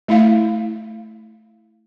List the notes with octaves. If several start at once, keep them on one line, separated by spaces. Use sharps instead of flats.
A3 E4 F5